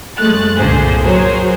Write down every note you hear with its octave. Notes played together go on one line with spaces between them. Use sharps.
F#2 G#3 A3 F#6 A6
C2 G2 A#2 D3 G#4 C5
F#3 F#4 G#4 A#4 C5 C#5